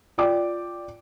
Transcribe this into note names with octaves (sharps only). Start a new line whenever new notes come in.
F4 D5 G5 D6